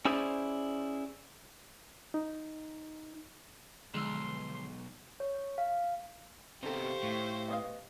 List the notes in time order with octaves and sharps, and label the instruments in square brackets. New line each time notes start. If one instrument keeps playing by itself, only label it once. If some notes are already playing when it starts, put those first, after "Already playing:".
[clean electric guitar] C#4 E4 G#4 C5 D5
[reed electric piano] D#4
[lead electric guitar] B1 [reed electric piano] D3 F3 E6 [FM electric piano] G#3 [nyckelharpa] C6
[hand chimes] C#5
F5
[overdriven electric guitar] C3 B3 [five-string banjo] D#3 A4 [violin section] G4 F5 C#6 [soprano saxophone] C5
[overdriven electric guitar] A2
[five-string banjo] B3 D#5 F5